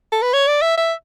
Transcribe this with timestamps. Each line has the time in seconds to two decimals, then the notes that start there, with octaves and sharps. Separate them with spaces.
0.12 A4
0.22 B4
0.33 C#5
0.47 D5
0.62 E5
0.77 E5